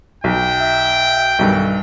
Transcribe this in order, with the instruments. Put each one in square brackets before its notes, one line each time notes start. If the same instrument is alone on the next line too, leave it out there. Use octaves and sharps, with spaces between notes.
[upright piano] B1 [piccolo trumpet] G5
[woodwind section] E5
[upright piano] B1 G2 [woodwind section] D#3 F#4 A4